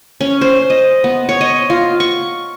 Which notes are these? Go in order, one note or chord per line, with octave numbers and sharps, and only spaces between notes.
C#4
C5
D#5
B3
C#5
D#5
F4
C#6